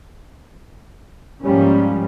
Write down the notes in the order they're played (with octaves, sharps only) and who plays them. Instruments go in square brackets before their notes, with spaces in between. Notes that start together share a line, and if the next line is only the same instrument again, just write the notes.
[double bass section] G#2 F3 G3 A#3 C#4